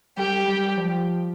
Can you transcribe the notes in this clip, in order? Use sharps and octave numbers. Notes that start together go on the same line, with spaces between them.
G3 G4
G3
F3